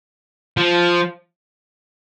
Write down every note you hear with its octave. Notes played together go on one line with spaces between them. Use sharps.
F3